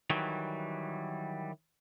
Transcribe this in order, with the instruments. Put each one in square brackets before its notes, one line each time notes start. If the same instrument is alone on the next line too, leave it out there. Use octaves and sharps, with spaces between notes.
[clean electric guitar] D#3 E3 F#3 G3